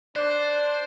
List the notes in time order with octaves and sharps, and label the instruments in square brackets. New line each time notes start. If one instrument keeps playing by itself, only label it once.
[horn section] D4 [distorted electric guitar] C5 [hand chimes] D5 D6 [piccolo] F#6